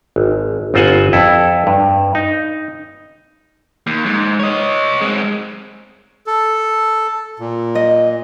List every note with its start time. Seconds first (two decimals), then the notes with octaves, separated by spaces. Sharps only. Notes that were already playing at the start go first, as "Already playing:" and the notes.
0.16 G#1
0.74 G1 C4 F4 C5 F#5 G#5
1.13 F2 E4 A4
1.67 G2
2.15 D#4
3.87 D#2
4.06 G#2
4.39 C#5 D#5
5.01 G#3 C4
6.27 A4
7.39 A#2
7.75 D#5